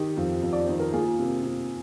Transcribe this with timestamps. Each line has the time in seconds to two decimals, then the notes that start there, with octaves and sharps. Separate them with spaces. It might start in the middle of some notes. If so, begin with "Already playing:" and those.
Already playing: D#3 D#4 G4
0.17 F2
0.43 F2
0.53 D5
0.66 D#3 C5
0.80 A#4
0.93 A#3 F4 G#4
1.19 C3
1.43 C3